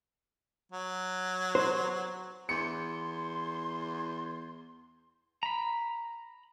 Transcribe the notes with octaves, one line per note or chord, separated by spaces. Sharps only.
F#3
C5
E2 C6 C#7
A#5 B5